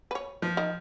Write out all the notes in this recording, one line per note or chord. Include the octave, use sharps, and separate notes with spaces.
B4 C#5
F3
D#3 A#4